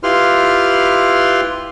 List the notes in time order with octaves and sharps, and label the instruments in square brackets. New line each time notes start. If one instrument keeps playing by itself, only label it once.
[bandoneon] E4 F4 G4 B4 C6 F6